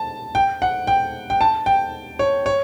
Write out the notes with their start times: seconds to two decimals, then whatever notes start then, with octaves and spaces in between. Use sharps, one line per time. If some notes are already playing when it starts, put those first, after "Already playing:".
Already playing: A5
0.35 G5
0.62 F#5
0.87 G5
1.30 G5
1.41 A5
1.66 G5
2.19 C#5
2.46 C#5